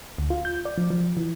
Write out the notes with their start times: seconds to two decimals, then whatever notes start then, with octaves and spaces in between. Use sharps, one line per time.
0.18 D2
0.30 F4
0.45 G6
0.65 D5
0.77 F3
0.90 F3
1.17 E3